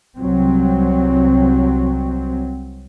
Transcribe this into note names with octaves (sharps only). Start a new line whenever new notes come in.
C2 F#3 C4